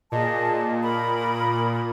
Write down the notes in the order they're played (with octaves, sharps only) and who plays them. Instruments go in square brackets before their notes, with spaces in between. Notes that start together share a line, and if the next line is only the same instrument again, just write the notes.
[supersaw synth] A#2 [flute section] G#4 D#5 A5
[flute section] A#4 B5 D#6